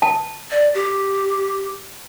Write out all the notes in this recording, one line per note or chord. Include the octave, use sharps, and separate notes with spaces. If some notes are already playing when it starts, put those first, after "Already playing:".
A5
D5
G4